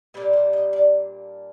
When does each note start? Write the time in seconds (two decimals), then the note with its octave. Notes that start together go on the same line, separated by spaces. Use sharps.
0.14 A#2 G3 A#3 D4 C5
0.33 C5
0.53 D#5
0.73 D5